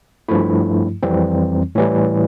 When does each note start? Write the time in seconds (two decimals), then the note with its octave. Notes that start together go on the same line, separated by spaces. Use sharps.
0.28 G2 F3 A3 E4
1.03 F2 E3 G3 C4
1.75 A2 E3 G3